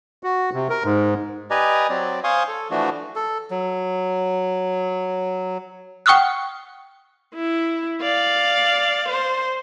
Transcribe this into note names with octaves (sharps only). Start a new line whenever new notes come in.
F#4
C3
A#4
G#2
G4 B4 D5 D#5 G#5 A#5
F#3 C4 D5
C5 F5 G#5 C6 C#6 D#6
A4
E3 F3 A3 D4 F#4
A4
F#3
F#5 G5 C#6 D#6 F6 F#6
E4
D5 F5
C5